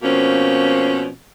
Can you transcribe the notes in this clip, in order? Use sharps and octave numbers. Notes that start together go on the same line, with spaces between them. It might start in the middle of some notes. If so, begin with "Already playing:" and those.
B2 F3 A#3 C4 C#4